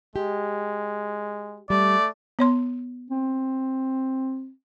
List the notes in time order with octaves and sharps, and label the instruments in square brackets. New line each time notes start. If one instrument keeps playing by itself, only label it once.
[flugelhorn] G#3 [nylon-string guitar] G4
[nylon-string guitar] G3 [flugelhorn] A3 [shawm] D5
[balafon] B3 C#5 C6
[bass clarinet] C4